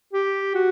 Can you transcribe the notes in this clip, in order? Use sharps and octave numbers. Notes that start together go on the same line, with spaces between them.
G4
F#4